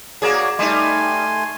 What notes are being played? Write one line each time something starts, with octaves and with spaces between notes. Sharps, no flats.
A#3 F#4 G#4 C#5 D5
G3 A3 D#4 G#5 C6